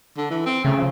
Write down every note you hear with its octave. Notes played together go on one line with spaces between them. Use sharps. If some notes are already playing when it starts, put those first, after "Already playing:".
D3
E3
C4
C#3 A3
F3